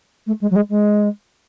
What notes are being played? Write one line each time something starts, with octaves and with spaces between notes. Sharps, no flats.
A3
G#3
F#3
G#3
G#3